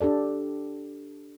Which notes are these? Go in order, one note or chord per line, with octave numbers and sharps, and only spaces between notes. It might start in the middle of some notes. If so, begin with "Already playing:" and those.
D4 G4 A4 D5